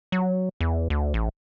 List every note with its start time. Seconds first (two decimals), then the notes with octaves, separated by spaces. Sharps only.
0.12 F#3
0.60 E2
0.90 D2
1.14 A1